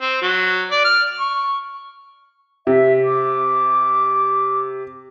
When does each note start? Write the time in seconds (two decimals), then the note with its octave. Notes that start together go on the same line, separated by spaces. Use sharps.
0.01 C4
0.22 F#3
0.71 D5
0.85 F6
1.20 C#6
2.67 C3 E5
3.05 D6